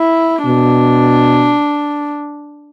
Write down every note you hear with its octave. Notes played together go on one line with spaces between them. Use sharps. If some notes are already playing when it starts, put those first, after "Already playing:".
Already playing: E4
B2 D4